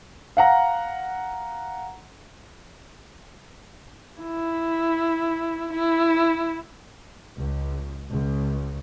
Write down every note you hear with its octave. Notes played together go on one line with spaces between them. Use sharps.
F5 F#5 A#5
E4
E4
C#2
C#2